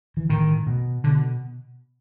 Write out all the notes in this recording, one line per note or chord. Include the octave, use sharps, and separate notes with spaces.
E3
A2 D#3
B2
B2 D3